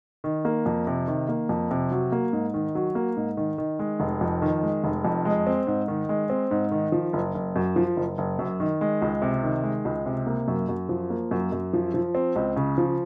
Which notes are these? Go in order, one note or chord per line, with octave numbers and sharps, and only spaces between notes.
D#3
A#3
F2
C3
D#3
A#3
F2
C3
F#3
A#3
G#2
D#3
F#3
A#3
G#2
D#3
D#3
G#3
F1
F2
D#3
G#3
F1
F2
G#3
C4
G#2
D#3
G#3
C4
G#2
D#3
F3
F#1
F#1
F#2
F3
F#1
F#1
F#2
D#3
G#3
C#2
C3
D#3
G#3
C#2
C3
A#3
F#2
F#2
F3
A#3
F#2
F#2
F3
F3
C4
C#2
C#3
F3